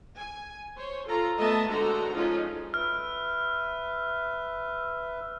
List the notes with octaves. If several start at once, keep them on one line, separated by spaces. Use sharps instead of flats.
G#5
C5 C#5
F4 A4 A#5
A3 B3 D#5 E5 A5
D3 G#3 F#4 A4 C5 A#5
F3 G#3 C#4 D#4 F4
B4 E5 F6